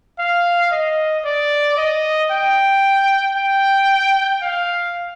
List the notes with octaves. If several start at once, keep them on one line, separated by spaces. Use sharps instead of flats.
F5
D#5
D5
D#5
G5
G5
F5